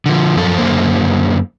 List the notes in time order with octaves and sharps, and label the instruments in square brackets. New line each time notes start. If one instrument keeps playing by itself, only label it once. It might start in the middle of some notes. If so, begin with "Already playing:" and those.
[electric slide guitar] D3 F3
F#2 F3 A4
F#2 D3 A#3 C5